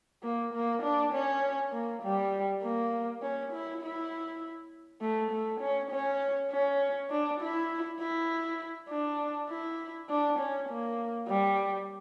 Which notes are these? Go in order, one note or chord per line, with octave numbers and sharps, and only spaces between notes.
A#3
A#3
D4
C#4
A#3
G3
A#3
C#4
E4
E4
A3
A3
C#4
C#4
C#4
D4
E4
E4
D4
E4
D4
C#4
A#3
G3